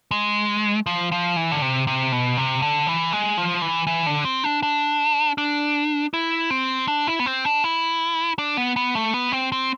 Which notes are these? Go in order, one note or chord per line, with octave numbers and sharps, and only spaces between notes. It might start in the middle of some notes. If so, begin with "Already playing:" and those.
G#3
F3
F3
E3
D3
C3
C3
B2
C3
D3
E3
G#3
F3
E3
E3
D3
C4
D4
D4
D4
E4
C4
D4
E4
B3
C4
D4
E4
D4
B3
B3
A3
B3
C4
C4